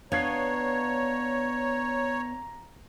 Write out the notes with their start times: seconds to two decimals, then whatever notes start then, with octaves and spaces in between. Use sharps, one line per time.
0.12 B3 D4 C#5 F5 A#5 G#6 C7